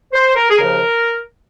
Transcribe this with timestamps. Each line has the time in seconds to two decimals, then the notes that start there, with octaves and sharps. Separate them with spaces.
0.13 C5
0.35 A#4
0.49 G#4
0.57 D#2 C#3 F3 A#4